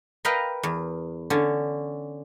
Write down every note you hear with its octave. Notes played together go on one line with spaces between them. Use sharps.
A#4 B4 D#5 F5 G5 A#5
E2
D3 C#4